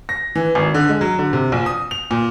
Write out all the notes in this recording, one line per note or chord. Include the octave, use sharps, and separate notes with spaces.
A#6
E3
G#1
D3
G#3
F#3
D3
C3
A#1
D#6
F7
A#2